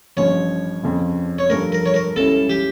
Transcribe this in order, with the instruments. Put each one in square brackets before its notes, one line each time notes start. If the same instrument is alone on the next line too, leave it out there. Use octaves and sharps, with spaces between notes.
[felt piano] A1 G2 F3 [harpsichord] C#5
[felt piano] F2 C#3 F3 C#4
[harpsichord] C#5
[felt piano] G2 F3 A3 [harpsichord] A#4
[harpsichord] A#4
C#5
A#4
[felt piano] C#2 C#3 G3 C#4 E4 [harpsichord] A4
[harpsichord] G4